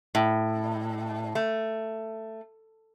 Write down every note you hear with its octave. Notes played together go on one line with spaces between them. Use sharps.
A2
A3